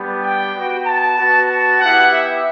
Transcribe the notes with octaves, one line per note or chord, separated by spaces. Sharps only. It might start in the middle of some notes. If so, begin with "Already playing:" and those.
Already playing: G3 B3 D4 G4
G5
B3 F#4
A5
B3 F#4
A5
B3 E4 G4 F#5
E5